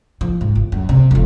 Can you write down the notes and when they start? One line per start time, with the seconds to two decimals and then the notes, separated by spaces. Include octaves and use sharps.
0.21 F3
0.41 G#2
0.55 G1
0.72 F#2
0.89 C3
1.11 F1 F2